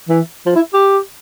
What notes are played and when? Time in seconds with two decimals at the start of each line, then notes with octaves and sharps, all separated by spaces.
0.09 E3
0.46 F3
0.55 E4
0.73 G4